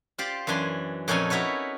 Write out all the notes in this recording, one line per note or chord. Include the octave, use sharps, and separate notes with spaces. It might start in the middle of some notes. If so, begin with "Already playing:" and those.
F4 G4 C5 D5
F#2 E3 D4 G#5 C6
F2 A#2 C#4 D#4 A4 G#5
D#4 E4 F#4 B4 C#5